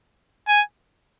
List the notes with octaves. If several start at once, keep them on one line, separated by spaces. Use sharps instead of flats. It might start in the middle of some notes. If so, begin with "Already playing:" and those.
G#5